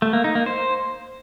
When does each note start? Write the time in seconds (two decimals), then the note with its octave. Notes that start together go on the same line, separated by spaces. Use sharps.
0.02 A3
0.13 A#3
0.24 D#4
0.35 A#3
0.46 C5